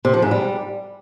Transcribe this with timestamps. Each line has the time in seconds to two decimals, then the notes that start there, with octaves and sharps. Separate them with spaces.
0.05 C3
0.13 F3
0.22 G#2
0.31 G3